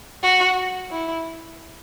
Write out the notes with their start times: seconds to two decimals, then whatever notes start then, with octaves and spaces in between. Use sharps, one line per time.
0.23 F#4
0.91 E4